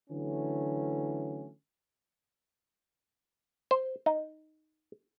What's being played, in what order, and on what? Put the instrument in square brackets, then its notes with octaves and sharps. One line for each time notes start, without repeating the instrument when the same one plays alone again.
[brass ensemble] D3 E3 F#3 A3 C#4
[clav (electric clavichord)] C5
D#4